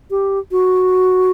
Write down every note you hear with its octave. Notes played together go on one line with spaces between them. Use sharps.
G4
F#4